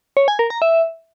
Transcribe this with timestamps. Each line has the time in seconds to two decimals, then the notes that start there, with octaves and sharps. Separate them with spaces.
0.17 C#5
0.28 G#5
0.39 A#4
0.50 A#5
0.62 E5